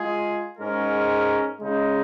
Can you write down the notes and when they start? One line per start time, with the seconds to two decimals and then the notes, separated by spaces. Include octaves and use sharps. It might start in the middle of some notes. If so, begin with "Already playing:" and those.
Already playing: G#3 F4 G#4
0.59 G#2 G#3 C#4 A#4
1.60 C#3 G#3 D#4